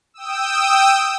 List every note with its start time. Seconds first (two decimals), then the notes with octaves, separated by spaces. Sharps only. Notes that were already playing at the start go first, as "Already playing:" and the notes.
0.14 G5 D#6 E6